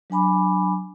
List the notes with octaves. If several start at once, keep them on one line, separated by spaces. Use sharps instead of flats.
F#3 D4 G#5 B5 D6